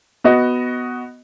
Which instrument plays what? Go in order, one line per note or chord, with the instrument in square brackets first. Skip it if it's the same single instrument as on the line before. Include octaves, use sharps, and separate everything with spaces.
[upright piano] B3 F#4 D#5